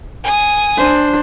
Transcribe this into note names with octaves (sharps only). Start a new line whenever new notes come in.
G#5 D#6
D4 C5